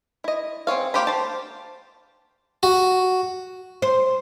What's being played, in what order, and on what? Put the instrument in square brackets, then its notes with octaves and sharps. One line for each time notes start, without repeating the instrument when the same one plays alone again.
[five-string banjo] E4 D#5
C4 G#4 C#5 F5
A#3 F4 G4 C5 B5
C5 A5
[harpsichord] F#4
[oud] C5